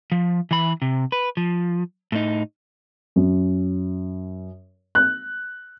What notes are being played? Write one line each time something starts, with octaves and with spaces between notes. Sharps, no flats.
F3
E3 B5
C3
B4
F3
A2 D#4
F#2
F#6